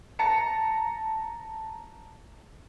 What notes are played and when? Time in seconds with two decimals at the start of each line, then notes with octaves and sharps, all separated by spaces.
0.19 A5 A#5 C#7